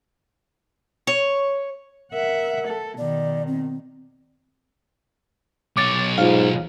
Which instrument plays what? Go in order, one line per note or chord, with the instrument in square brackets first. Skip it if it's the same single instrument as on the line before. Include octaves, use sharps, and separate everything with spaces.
[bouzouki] C#5
[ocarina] A#4 [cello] E5 F#5
[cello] A4
[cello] B2 D#3 [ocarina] D5
[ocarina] C4
[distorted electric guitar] B1 C#5 [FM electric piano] D6 A6
[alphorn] G#2 [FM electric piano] F4 F5